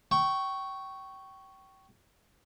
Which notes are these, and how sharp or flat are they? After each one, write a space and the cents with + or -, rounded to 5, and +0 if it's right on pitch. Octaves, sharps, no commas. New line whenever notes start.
G5 -25 C#6 +0